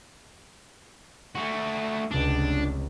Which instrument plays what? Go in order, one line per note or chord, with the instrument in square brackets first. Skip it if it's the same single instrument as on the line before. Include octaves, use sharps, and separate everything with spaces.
[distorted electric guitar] A3 F#4
[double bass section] F1 C#2 [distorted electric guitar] D4